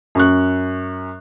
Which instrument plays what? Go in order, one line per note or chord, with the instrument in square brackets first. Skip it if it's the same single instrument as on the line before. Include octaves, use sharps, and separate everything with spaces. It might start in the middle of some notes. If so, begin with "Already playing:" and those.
[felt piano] F#2 C#6 F#6